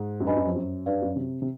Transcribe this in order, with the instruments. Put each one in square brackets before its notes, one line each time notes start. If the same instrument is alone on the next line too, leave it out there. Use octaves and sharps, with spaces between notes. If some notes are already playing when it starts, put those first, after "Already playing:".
Already playing: [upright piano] G#2
F#2
[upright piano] G2 [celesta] G4 B4 D#5 G#5 B5
[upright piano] F#2
F2
F#2
[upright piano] G2 [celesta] B4 D5 F5
[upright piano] F#2
C3
C3